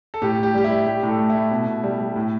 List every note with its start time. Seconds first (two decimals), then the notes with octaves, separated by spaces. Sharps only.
0.14 A4
0.22 A2 G4
0.38 A2 G4
0.54 G3 G4
0.64 E4
0.70 G3
0.86 A2 G4
1.03 A2
1.08 A4
1.19 A3
1.30 E4
1.35 A3
1.51 B2
1.67 B2
1.83 G3
2.00 G3
2.16 A2